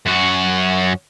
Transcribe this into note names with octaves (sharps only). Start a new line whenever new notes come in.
F#2 F#4